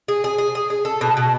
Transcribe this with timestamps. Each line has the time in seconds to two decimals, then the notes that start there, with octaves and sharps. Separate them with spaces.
0.08 G#4
0.24 G#4
0.38 G#4
0.55 G#4
0.70 G#4
0.85 A4
1.01 B2
1.17 B2